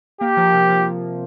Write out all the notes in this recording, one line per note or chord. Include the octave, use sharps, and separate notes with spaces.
A#3 G4
F3
C3
F3